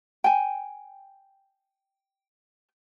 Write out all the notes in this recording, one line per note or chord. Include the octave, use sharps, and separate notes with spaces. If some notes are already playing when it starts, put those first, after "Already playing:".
G5 G#5